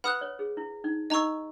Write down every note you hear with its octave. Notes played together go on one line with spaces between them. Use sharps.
B4 F#5 B5 D#6 F#6
C#5
G#4
E4
D#4
D#4 D#5 A#5 C#6 E6